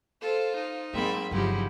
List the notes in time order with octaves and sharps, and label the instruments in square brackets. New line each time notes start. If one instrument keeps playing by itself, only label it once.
[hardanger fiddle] F4 C5 [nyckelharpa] A4
[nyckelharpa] D#4
[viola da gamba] G#2 A#3 C4 [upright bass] F#3 [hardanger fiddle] E5 B5
[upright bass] G1 F#3 [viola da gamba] C#3 F3 E4 [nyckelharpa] D#4 G4 [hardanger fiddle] F#4